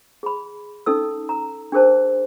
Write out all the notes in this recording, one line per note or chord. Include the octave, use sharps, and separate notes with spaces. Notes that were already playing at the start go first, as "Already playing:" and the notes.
G#4 B5
C#4 D#4 A4 E6
A#5
D4 G#4 A#4 C5 A5